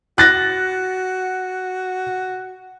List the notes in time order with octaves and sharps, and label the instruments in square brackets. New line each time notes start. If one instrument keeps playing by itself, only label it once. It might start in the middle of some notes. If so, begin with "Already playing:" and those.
[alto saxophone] F#4 [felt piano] F#6 A6 A#6